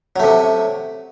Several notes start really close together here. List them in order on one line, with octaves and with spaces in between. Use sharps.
F#3 A3 C3